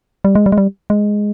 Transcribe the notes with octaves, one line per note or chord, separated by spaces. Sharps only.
G3
G#3
G3
G#3
G3
G#3